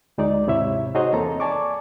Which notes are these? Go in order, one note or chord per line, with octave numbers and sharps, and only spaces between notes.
D2 G#3 D#4 D5
D#2 G#2 C3 E4 C#5 E5
D#4 F#4 G#4 C5 C#5 D#5
E2 A#3 C4 A4 A#5
D5 G#5 A5 C#6 D6